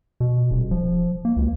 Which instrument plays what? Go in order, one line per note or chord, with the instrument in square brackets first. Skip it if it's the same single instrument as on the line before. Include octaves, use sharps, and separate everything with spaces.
[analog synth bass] B2
D#1
F3
A#3
C#2